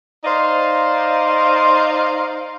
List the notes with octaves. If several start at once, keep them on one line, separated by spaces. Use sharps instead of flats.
D#4 C5 D5 D#5 F5